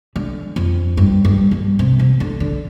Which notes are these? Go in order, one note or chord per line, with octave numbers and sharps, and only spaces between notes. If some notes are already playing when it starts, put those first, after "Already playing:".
D3
F2
G2
G2
G2
C3
C3
D3
D3